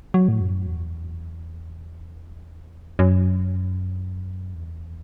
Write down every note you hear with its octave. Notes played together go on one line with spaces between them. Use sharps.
F#3
A2
F#2
E2
F#2
E2